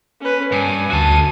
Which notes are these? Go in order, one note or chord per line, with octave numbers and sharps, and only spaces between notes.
C#4 B4
G2 G#5 D#7
D2 F#4 A5 D#7